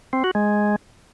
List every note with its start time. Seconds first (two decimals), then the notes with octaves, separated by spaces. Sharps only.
0.13 C4
0.24 F#4
0.35 G#3